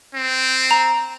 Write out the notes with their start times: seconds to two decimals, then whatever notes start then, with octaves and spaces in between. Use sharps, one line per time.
0.14 C4
0.71 A#5